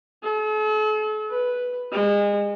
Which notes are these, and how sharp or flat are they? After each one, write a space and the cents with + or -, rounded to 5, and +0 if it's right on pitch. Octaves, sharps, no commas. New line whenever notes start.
A4 -45
B4 +0
G#3 -30